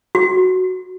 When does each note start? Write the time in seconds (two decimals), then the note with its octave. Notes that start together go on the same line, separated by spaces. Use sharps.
0.15 F#4